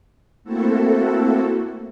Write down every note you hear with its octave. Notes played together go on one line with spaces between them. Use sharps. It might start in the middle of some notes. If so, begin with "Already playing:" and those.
A3 A#3 C4 E4 F#4 A4